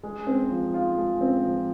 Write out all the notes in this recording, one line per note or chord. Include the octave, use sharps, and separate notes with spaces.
G#3
C4
F3
F4
G#3
C4
F3